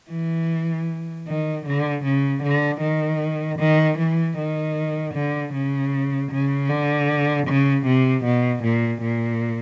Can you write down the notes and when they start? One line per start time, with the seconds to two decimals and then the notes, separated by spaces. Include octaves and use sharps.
0.10 E3
1.27 D#3
1.66 D3
2.04 C#3
2.43 D3
2.81 D#3
3.59 D#3
3.99 E3
4.37 D#3
5.14 D3
5.54 C#3
6.31 C#3
6.69 D3
7.47 C#3
7.86 C3
8.25 B2
8.63 A#2
9.02 A#2